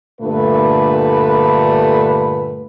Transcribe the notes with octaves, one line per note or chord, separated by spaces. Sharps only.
G2 A#2 D3 A3 B4